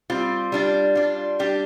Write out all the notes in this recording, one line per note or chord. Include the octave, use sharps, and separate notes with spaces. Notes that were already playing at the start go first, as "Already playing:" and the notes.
G3 C4 F4
G3 D4 F4
G3 D4 F4
G3 D4 G4